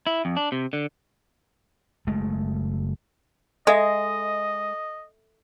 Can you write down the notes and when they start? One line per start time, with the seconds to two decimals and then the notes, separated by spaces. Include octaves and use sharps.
0.07 E4
0.25 F2
0.36 D4
0.52 C3
0.73 D3
2.07 F#1 G#3 A3
3.67 G#3 A4 D#5 E5